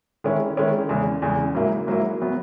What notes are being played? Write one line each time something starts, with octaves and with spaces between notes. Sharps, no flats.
D#3 G#3 C#4 E4
D#3 G#3 C#4 E4
E2 C#3 G#3
E2 C#3 G#3
G#2 F#3 A#3 E4
G#2 F#3 A#3 E4
F#3 B3